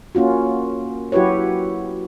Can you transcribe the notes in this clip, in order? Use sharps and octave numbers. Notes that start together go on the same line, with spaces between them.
A#3 C#4 F4 F#4
F#3 E4 F#4 G4 B4 C#5